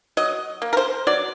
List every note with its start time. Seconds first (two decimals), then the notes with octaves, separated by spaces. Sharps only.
0.17 F#3 D#5
0.62 A#3
0.73 A#4
0.77 C5
1.07 F#3 D5